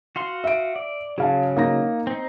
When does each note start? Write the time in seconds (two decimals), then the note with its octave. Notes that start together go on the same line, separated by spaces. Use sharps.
0.16 F#4 F5 C6
0.44 E5 D7
0.76 D5
1.18 C#3 F#3 G#4 F5 A5
1.57 A#3 D#4 A#6
2.07 C4 D#4